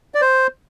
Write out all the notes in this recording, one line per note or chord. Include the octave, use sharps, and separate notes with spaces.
D5
C5